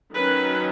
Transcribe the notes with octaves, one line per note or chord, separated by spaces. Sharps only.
D#3 F#3 C#4 B4